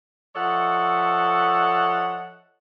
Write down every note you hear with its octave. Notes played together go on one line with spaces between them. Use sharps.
F3 A4 C#5 D#5 E5 F#5